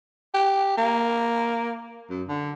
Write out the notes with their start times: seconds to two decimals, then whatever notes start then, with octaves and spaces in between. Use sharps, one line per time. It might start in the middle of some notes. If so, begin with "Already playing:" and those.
0.34 G4
0.78 A#3
2.10 F#2
2.28 D3